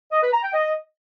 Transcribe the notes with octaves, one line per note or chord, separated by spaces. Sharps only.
D#5
B4
A#5
G5
D#5